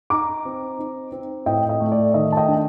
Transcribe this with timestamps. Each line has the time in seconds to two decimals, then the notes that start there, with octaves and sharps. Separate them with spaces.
0.10 D#4 A#5 D6
0.45 C4
0.79 D#4
1.12 C4
1.46 A2 D#5 G5
1.69 D#5
1.80 A3
1.92 D5
2.14 D#3 D#5
2.32 A5
2.37 D#5 G5
2.48 D4